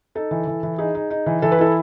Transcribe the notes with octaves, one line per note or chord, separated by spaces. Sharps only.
D#4 A4
E3
E3
E3
D#4 G#4
D#4
D#4
E3
E3 A4
B4
E4 A4